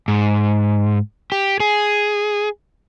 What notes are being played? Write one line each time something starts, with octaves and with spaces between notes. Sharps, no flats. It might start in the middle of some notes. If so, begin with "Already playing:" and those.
G#2
G4
G#4